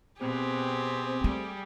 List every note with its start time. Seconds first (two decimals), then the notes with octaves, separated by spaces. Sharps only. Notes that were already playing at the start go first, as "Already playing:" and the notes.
0.20 B2 C4 G4 G#4
1.24 G3 A3